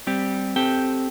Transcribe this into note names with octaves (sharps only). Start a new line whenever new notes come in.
G3 C4 G4
C4 G4 A4 G5